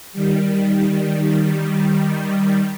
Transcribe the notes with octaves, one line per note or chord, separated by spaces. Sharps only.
D#3 G3